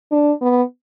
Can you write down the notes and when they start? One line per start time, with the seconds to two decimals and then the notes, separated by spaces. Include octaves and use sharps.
0.12 D4
0.41 B3